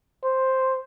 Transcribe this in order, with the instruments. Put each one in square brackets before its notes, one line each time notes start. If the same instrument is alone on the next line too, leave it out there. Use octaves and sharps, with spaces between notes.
[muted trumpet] C5